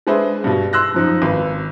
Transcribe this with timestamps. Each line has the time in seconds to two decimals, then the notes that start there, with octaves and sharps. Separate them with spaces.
0.07 G#3 D4 G#4 B4 C5 E5
0.44 G2 B2
0.73 C6 E6 F#6 A#6
0.94 F#2 F3 D#4
1.22 G#1 B4